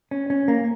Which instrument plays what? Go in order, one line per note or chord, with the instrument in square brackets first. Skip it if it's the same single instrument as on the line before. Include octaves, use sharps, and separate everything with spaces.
[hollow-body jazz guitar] C#4
C#4
A#3